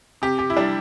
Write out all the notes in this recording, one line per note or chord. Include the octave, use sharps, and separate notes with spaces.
C3 G4
G4
E4
G3 D4